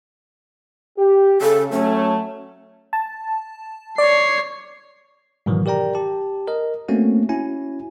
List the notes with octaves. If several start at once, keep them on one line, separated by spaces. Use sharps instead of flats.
G4
C#3 A4
F#3 A3 C#4
A5
C#5 D5 C7
G#2 B2 D#3 E3 F#3
G4 A#4 D5 G5 A#5
G4 A5
A#4 D#5
A3 A#3 C4 C#4 F#4
C#4 E4 F#4 G#5